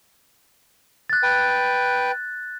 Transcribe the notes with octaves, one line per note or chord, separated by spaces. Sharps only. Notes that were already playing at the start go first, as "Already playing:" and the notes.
F#6 A6
B4 G5